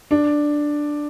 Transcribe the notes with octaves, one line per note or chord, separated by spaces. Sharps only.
D4